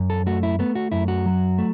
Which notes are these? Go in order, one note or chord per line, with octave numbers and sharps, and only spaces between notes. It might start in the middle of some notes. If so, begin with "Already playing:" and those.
Already playing: F#2
A4
A3 F#4
E4
A3 B3
F#4
F#2 E4
F#4
F#3
A3